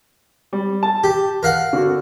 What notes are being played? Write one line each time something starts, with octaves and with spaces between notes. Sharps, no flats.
G3
A5
G4
A#4 F5 F#5
D3 F#4